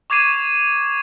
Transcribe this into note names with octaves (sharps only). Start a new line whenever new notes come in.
C#6 D6 G#6 C7 D#7 E7